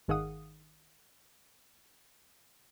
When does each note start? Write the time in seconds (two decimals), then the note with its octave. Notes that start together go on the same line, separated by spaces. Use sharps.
0.08 G#1 D#3 G#4 F5 F#5 D#6